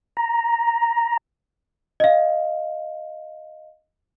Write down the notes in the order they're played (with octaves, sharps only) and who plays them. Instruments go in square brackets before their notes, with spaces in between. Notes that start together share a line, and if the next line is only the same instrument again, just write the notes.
[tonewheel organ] A#5
[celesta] D#5 F5